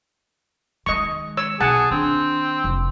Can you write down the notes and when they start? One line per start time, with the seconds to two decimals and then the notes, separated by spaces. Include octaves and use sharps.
0.86 D#3 G#3 D#5 C#6
1.37 C#5 E6
1.60 B1 G#4 F#5 A5
1.91 D#3 C4 D4
2.64 F1